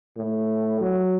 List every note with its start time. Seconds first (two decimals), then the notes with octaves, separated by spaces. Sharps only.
0.17 A2
0.81 F#3